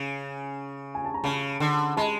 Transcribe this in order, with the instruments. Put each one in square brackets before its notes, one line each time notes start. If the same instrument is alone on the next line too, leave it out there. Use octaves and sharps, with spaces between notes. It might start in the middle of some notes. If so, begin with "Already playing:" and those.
Already playing: [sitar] C#3 [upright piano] G#5
[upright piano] G#5
A5
A#5
[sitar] C#3 [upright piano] A5 B5
[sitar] D3
[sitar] G#3 [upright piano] A5 B5